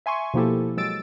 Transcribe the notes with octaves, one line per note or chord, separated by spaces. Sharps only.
E5 G#5 C6 C#6
B2 F3 A#3 E4 G4 A4
F#3 G#3 E6 A6 D7